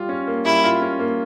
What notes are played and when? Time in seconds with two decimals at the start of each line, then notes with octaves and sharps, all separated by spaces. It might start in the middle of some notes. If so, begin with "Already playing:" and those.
Already playing: G3 F4
0.09 C#4
0.27 A#3
0.45 G3 E4
0.64 F4
0.82 C#4
0.99 A#3